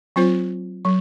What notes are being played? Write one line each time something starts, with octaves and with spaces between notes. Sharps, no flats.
F#3 C4 F4 C5
F#3